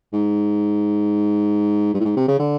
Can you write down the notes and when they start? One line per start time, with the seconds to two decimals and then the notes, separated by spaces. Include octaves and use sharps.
0.13 G#2
1.94 G2
2.00 A2
2.05 G#2
2.16 C3
2.28 C#3
2.39 D3